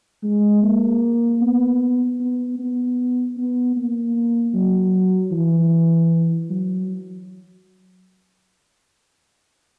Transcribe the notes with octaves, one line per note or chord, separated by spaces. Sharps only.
G#3
A#3
B3
B3
B3
B3
A#3
F#3
E3
F#3